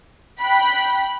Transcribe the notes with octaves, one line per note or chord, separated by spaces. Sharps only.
G5 B5 F#6